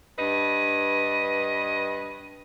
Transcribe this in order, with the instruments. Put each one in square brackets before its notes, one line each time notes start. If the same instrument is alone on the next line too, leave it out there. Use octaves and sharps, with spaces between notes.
[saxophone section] G2 B4 D#5